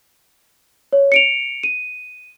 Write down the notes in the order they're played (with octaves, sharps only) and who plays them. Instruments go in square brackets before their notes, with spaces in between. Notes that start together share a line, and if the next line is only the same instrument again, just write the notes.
[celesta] C#5
C#7 D7 F7
D#7